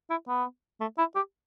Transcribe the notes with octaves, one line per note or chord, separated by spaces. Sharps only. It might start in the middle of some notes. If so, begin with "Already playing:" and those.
E4
B3
A3
E4
G4